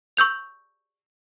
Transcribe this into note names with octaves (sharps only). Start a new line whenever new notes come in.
C#6 E6 G6 F7